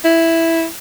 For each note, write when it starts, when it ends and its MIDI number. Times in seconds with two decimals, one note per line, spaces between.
0.04 0.66 64